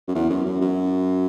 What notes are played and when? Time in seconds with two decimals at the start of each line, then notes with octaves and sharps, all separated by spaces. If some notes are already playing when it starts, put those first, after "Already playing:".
0.08 F#2
0.15 E2
0.29 F#2
0.46 F#2
0.61 F#2